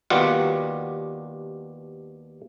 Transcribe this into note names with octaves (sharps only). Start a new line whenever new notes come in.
D#2 B2 G3 F4 F#5